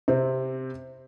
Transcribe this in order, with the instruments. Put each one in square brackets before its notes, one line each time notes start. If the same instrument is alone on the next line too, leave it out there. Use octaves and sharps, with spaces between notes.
[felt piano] C3 C4